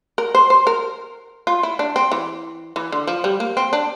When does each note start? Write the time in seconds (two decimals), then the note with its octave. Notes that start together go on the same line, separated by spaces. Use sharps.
0.18 A#4
0.35 C5
0.50 C5
0.67 A#4
1.47 F4
1.63 E4
1.79 D4
1.96 C4
2.12 E3
2.76 E3
2.92 D3
3.07 F3
3.24 G3
3.40 A#3
3.57 C4
3.73 D4